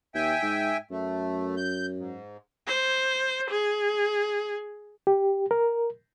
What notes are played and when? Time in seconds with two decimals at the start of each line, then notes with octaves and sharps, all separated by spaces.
0.15 D#2 E5 G5 G#5
0.43 G#2
0.91 F#2 A3
1.57 G6
1.97 G#2
2.67 C5
3.50 G#4
5.07 G4
5.51 A#4